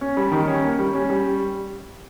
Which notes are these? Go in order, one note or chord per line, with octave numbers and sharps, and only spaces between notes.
C#4
G3
D#3
C#4
A#3
G3
C#4
G3